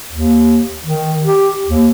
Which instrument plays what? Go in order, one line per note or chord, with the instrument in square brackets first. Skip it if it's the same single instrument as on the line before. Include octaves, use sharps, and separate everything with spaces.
[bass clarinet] D#2
D#3
G4
D#2